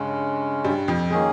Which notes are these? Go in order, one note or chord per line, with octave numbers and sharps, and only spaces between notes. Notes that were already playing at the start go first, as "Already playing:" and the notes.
Already playing: G2 C#3 G#3 C#4
G2 G3
F2 F3
D#3 G#3 A#3 C#4 G#4